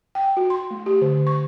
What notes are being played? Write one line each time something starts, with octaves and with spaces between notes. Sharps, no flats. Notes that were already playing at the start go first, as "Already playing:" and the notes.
G5
F#4
C6
A3
G4
D3
C#6